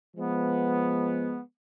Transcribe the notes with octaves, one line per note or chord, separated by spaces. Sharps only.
F3 G#3 B3